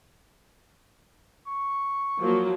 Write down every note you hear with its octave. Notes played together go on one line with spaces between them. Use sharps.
C#6
F3 F#3 A#3